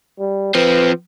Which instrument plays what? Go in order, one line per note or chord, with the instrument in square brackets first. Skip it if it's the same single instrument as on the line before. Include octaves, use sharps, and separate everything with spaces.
[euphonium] G3
[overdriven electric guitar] F3 C4 [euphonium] B4